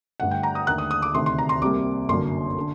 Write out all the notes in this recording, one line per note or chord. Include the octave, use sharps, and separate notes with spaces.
G2 D3 A3 F#5
G5
A#5
D#6
D#2 D3 A3 F#6
D#6
D#6
D6
D2 C3 D#3 A3 C6
C6
A#5
C6
C2 C3 G3 A#3 D6
G1 F#2 D3 F#3 A#3 C6
D3